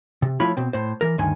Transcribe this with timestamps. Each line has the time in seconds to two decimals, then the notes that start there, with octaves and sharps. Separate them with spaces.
0.22 C3
0.40 F3 A3 E4 F4 C#5 B5
0.57 B2 C4
0.73 A2 C5
1.01 E3 A#4
1.18 D2 G2 D#3 G#5